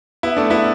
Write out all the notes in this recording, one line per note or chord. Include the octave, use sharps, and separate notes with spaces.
B3 E4
A3 D4
B3 E4